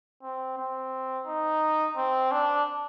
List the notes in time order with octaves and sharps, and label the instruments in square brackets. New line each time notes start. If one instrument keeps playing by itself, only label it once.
[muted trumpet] C4
C4
D#4
C4
D4